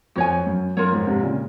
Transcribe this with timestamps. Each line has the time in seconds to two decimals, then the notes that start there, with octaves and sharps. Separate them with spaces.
0.16 F2 F#4 C#5 G#5
0.46 F#2
0.77 F#2 F4 A#4 C#5
0.92 F2 G#2
1.07 G#2 C3
1.23 A#2 C#3